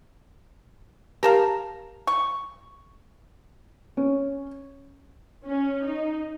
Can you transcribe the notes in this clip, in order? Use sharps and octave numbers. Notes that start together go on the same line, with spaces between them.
G4 A#4 F5 A5 A#5
C#6
C#4
C#4
D#4